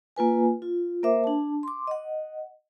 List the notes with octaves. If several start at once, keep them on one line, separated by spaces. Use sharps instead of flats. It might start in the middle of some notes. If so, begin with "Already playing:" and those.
A#3 F4 B4 G#5
F4
A#3 A#4 C5 E5 D6
D4 A5
C6 D6
D#5 F#5